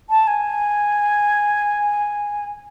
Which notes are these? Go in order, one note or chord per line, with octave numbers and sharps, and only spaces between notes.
A5
G#5